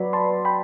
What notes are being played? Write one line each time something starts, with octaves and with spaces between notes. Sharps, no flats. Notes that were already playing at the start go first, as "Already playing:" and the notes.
Already playing: F#3 B4 D5 B5
A5 C6
G5 B5